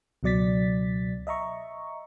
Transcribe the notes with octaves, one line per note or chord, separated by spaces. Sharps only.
C#2 B2 F#3 D5 A6 B6
D#5 E5 A#5 C#6